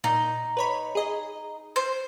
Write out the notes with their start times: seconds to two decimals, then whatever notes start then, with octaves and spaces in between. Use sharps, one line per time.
0.04 A#2 D#4
0.57 B4 C#5 B5
0.95 G#4 D#5
1.76 C5